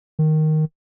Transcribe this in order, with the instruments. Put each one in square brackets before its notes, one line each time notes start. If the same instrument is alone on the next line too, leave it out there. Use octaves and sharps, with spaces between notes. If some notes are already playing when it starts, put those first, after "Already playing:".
[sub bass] D#3